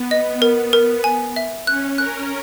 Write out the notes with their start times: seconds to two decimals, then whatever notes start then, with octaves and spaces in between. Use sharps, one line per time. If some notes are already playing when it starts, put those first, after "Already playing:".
Already playing: B3
0.11 D#5
0.42 A#4
0.73 A#4
1.04 G#5
1.36 E5
1.67 C#4 F#6
1.98 A#4 F#6